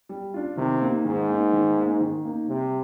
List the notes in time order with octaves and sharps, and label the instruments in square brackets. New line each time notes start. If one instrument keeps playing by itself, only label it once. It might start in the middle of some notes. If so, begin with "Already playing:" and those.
[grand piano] G3
D4 F4
[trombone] C3 [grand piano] D#3
[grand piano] A#3 D#4
[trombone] G#2 [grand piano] D#3
[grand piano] A#3 D#4
D#3
A#3
D#4
D#3
A#3 D#4
[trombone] C3 [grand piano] G3